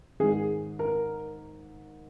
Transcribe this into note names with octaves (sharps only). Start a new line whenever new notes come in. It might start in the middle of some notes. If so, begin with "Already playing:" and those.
G#2 D#3 G#4
A#4